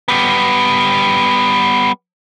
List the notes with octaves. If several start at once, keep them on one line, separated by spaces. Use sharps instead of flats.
G3 B3